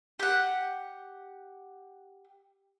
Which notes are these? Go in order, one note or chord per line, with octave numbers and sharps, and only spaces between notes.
G4 F#5